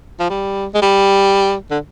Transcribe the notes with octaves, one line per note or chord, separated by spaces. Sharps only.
F3
G3
G#3
G3
D3